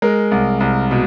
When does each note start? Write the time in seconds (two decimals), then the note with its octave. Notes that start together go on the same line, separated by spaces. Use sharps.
0.02 G#3 A#4
0.31 C2
0.60 C2
0.91 B2